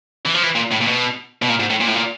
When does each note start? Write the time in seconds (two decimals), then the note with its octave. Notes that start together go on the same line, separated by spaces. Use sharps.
0.26 E3
0.35 F3
0.43 E3
0.56 A#2
0.72 A2
0.82 A#2
0.88 B2
1.42 B2
1.49 A#2
1.60 G#2
1.70 A2
1.81 A#2
1.88 A2
1.95 A#2